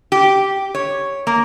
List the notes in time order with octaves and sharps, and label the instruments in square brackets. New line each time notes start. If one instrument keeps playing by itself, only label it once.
[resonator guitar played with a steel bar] G4
C#5
A#3